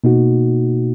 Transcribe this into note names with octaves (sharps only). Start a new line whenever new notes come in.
B2 A#3 D#4 F#4